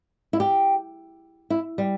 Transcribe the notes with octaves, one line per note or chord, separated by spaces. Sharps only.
E4
G4
E4
G3